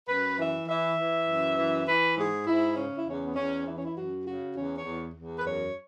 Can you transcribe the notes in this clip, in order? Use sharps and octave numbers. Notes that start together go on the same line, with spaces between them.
F#2 B4
E3 E5
E3 E5
E3
F#2
E3
E3 B4
G#2 G#4
G#2 E4
C#3 C#4
E4
E2 C#4
B3
E2 C#4
E3 E4
C#4
E4
F#2 F#4
C#3 F#4
E2 C#4
C#5
E2
E2
B4
F#2 C#5